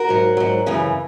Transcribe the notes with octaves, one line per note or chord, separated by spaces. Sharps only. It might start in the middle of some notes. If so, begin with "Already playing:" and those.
Already playing: F#4 A#4
G#2 F#3
G#2 F#3
F#2 C#3 E3